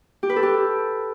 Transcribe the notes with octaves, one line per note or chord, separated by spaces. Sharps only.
G4
B4
A4
G4